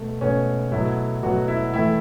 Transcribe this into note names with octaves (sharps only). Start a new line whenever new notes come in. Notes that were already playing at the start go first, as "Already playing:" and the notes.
Already playing: B2 A3
B2 A3 C#4
B2 F#3 A3 E4
B2 F#3 A3 F#4
E4
A2 E3 A3 E4